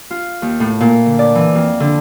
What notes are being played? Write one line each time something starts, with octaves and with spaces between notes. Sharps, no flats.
F4
D#2
A2
A#2
D3
D5
E3
F2
D3